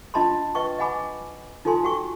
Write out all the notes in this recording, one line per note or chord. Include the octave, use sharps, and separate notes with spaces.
D4 F4 D#5 A5 B5 C6
B4 D#5 G5 C#6
D#5 F#5 G#5 B5 D6
D#4 F4 A4 G#5 C6
F#4 G5 C#6